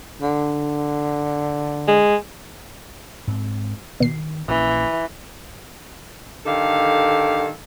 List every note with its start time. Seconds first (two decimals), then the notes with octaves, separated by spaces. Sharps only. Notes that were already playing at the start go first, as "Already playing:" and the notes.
0.22 D3
1.88 G#3
3.27 G#2 C4
4.00 B2 D#3 C7
4.48 A#1 E3 A#3 C#4
6.46 D3 D#3 G4 A4 F5